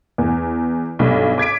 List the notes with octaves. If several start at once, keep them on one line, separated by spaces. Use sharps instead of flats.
E2
B1 G2
D6 G#6 B6 D7